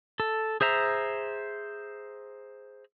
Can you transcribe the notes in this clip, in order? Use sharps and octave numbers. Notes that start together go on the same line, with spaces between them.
A4
G#4 C5 E5 A#5